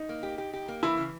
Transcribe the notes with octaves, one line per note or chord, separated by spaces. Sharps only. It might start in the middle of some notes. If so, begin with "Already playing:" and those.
Already playing: D#4
A#3
G4
G4
G4
A#3
E3 E4
C#3